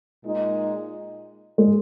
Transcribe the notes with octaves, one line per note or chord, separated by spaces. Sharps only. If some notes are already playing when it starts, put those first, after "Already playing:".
A#2 G#3 D#4
G#3